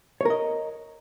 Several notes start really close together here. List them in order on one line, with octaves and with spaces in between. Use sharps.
C#5 A#4 D#5